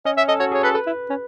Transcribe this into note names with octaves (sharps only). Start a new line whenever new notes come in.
C#4 D#5
C#4 E5
A4 D#5
F#4 C#5
G#4 C#5
A4 B4
A4 B4
E4
C#4